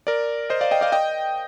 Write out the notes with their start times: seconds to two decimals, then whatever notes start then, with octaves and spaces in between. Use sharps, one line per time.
0.07 A#4 D5
0.50 C5 D#5
0.61 D5 F5
0.71 D#5 G5
0.81 D5 F5
0.92 D#5 G5